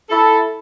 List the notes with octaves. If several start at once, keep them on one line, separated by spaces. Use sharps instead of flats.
E4 A4